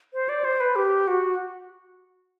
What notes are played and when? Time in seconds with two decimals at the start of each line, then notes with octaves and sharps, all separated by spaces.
0.13 C5
0.29 D5
0.44 C5
0.60 B4
0.75 G4
1.07 F#4